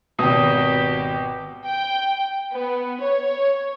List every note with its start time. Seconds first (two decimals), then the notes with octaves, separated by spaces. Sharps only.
0.19 G#1 B2 G4 D#6
1.66 G5
2.53 B3
3.01 C#5